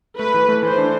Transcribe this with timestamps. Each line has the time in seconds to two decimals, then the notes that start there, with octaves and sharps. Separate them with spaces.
0.18 A3 B4
0.34 E3
0.49 A3
0.63 E3 C5
0.78 D4